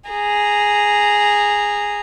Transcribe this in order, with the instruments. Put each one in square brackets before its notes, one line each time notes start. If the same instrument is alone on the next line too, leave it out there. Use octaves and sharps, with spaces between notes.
[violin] G#4 A#5